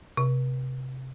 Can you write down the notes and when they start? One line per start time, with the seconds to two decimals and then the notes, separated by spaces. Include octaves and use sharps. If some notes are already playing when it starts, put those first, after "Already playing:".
0.17 C3